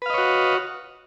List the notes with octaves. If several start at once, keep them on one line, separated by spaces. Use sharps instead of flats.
F#4 B4 C#5 D#5 F5